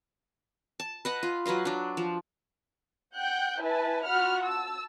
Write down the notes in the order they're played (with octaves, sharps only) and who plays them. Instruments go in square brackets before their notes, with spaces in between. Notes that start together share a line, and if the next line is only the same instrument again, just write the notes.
[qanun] A5
B4 D#5 F#5
F4
F#3 B4 D#5 F5
F#3 D4
F3
[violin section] F#5 G5 F#6 G6
E4 B4 G#5 A5
F4 F#4 F#5 B5 F6
A5 E6